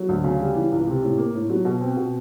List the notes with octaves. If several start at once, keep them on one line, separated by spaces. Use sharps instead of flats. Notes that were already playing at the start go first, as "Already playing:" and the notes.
Already playing: F#3
D2
C#3
G3
E3
C#2
C3
A2
A#3
A2
F#3
B2
C4
B2